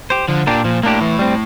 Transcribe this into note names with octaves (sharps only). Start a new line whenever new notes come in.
G4 C5
D3 F3
A#2 A#3 D4 G4
A#2 F3
A2 A#3 D4 G4
E3
G3 C4